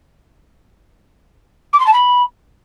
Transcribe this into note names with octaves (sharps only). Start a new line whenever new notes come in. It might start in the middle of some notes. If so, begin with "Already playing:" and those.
D6
C6
A5
B5